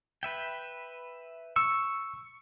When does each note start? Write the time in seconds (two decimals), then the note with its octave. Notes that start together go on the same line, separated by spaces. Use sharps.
0.23 B4 E5 G5
1.56 C#6 E6